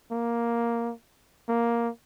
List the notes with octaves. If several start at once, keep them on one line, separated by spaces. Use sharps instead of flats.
A#3
A#3